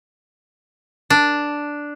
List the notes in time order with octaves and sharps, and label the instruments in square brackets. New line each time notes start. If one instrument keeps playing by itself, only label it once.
[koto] D4